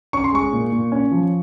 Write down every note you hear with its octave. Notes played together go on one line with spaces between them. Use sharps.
C#4 C#6
C6
G#3 C#6
A#2
A#2
C#4
F3